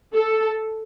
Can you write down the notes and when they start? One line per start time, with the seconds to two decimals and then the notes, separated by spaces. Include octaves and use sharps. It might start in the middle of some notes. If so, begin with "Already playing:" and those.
0.14 A4